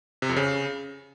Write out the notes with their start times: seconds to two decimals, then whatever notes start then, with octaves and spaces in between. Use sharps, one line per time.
0.22 C3
0.29 F2
0.36 C#3